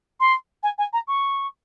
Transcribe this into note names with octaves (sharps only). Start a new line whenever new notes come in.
C6
G#5
G#5
A#5
C#6